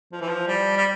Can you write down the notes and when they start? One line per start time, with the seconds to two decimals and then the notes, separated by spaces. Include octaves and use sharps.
0.12 F3
0.21 E3
0.28 F3
0.48 G3
0.76 G3